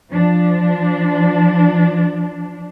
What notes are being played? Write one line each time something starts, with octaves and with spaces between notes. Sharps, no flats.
F3 D4